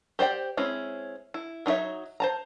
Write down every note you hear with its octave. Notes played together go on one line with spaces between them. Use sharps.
G4 C5 D5 G5
G#3 C4 C#4 E4
E4
F#3 D#4 F4 C#5 E5
C5 A5 A#5